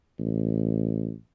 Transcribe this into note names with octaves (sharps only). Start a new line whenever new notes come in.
A1